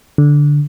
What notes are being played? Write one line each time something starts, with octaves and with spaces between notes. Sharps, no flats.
D3